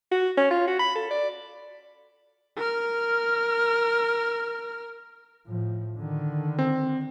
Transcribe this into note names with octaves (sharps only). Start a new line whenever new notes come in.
F#4
C#4
F4
F#4
B5
A4
D5
A#4 F6
A2 F3
D3 D#3
C4